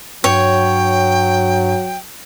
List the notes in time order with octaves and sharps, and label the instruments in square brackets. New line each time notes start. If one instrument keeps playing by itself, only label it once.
[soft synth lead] G2 [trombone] F#3 [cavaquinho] C#5 [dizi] G5